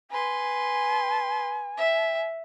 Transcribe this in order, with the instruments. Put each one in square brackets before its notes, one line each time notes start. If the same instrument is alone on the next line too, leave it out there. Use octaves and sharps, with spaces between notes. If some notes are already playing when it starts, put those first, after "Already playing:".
[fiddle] B4 C6 [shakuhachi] G#5
[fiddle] E5